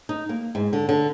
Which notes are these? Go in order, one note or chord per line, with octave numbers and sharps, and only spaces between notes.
D#4
A#3
G#2
D3
D3